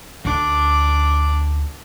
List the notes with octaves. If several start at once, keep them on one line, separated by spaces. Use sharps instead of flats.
D2 D4 D6